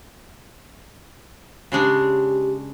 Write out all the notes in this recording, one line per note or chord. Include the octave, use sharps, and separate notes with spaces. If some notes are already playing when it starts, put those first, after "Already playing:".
C#3 G#3 D4 G4